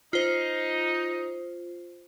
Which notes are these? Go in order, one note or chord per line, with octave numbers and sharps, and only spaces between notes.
D#4 F4 C5